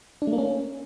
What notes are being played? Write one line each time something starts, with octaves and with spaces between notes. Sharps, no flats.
D4
A3
A#3
C#4